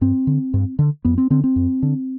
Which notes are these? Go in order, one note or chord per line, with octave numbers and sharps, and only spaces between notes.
G2 C4
D3
G2
D3
F2 B3
C4
D3 C4
C4
F2
D3